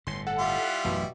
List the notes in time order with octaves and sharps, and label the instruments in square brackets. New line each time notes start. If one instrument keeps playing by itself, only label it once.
[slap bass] G1 A2 [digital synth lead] C6
[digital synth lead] A4 [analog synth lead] F#5
[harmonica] G3 E4 F4
[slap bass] A1 [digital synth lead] F#2 [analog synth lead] B2